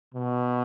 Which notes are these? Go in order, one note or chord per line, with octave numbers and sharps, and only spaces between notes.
B2